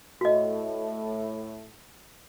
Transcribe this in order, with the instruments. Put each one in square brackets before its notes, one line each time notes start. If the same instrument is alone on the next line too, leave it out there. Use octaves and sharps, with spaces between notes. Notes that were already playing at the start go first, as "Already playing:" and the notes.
[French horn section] A2 A3 [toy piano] F#4 D#5